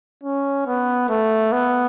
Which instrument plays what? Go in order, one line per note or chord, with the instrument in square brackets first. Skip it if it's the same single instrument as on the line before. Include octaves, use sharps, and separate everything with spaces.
[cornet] C#4
B3
A3
B3